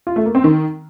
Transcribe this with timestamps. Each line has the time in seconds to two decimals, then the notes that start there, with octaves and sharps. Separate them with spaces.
0.07 F4
0.16 A3
0.25 A#3
0.35 C4
0.44 D#3